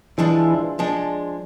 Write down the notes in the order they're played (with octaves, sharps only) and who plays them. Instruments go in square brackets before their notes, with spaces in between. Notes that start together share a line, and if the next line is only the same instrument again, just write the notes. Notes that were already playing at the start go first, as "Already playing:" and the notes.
[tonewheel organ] E3 [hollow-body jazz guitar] F3 G#3 D4
[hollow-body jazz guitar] F3 G#3 D4